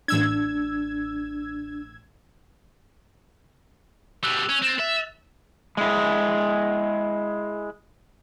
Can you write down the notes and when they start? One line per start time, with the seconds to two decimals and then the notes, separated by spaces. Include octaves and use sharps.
0.08 A1 D4 E6 G#6
4.23 B2 G3 E6 F#6 F7
4.49 C#4
4.62 C4 A6 E7
4.80 E5
5.77 G#3 E4